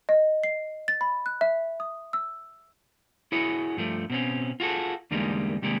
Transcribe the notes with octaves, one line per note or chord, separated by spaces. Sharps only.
D#5
C7
A6
B5
F#6
E5
D#6
E6
E4 F#4 G#4 C#5
G2 F3 A3
B2 C4 C#4
F4 F#4 G#4 A4
E2 D3 G3 G#3 A#3 D#4
C3 D#3 G3 G#3 A#3